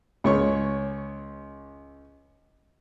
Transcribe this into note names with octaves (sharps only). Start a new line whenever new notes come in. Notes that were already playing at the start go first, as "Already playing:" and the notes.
C#2 C#5 C#6